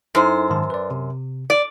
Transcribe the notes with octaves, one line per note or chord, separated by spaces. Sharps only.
F#2 D#4 E4 A4 C5
G#2 D#3 A5
B4 D5
C3
D5